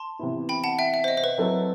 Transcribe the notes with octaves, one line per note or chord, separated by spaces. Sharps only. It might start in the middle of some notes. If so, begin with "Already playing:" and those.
Already playing: A5 C6
C3 E3 B3 E4
G5 B5
F#5 A5
E5 G5
E5
C5
D#5
C5
B4
F#3 C4 E4 A4